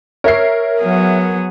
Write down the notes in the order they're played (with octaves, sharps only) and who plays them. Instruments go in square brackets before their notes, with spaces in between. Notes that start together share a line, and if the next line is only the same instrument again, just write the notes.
[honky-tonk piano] A#4 C7 [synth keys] C#5 E5
[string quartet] F#3 B3 G#4